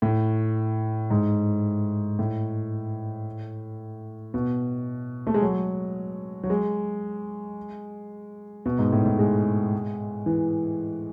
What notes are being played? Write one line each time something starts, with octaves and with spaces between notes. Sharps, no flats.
A2
G#2
A2
B2
A3
G#3
F#3
F#3
G#3
B2
G#2
A2
A2
G#3
E3